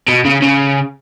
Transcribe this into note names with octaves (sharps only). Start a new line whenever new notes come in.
B2
C#3
C#3